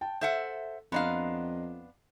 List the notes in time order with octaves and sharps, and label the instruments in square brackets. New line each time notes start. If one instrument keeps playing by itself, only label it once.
[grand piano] G5 A5
[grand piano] A4 [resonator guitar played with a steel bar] C5 E5 F#5
[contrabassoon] F2 [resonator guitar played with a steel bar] B3 D4 F5 [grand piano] D#5 A#5 C6